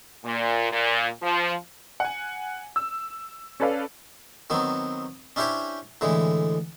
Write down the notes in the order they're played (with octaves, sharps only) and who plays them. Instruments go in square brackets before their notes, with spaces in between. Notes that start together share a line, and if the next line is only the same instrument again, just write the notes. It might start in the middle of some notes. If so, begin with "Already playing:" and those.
[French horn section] A#2
A#2
F3
[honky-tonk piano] F#5 G#5
E6
C#4 A4 B4 D5 F5
[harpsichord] D#3 F#3 B3 C4
C#4 D4 E4 G4 C5 C#5
A2 D3 E3 G#3